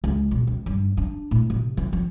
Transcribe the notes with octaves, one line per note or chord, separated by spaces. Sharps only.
C#2
B2
C#2
G2
D4
A2
C3
E3
F3